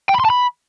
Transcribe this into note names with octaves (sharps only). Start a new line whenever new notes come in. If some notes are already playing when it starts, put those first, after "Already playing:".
G5
B5
C6
A5
B5